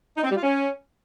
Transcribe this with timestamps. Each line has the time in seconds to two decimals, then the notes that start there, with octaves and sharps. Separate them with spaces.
0.17 D#4
0.24 C4
0.30 G3
0.36 F4
0.43 C#4